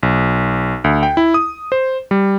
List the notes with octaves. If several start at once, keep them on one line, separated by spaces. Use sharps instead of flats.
B1
D2
G5
E4
D#6
C5
G3